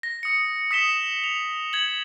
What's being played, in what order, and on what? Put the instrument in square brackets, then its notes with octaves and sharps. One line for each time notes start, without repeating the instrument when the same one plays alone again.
[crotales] A#6
D#6 C#7
D#6 B6 E7 G7
F7
G#6 F#7